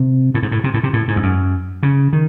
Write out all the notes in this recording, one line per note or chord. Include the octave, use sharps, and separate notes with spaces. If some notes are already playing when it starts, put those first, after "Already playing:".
Already playing: C3
A2
G#2
A2
C3
A2
C3
A2
G#2
E2
F#2
C#3
D#3